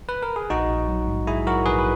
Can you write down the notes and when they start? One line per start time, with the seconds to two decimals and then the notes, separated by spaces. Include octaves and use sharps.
0.09 B4
0.23 A#4
0.36 G#4
0.50 A#1 D#4 F#4
0.69 A#1
0.89 F#3
1.08 G#2
1.27 G#2 E4 G#4
1.47 F#3 F#4 A#4
1.66 A#1 G#4 B4
1.79 B4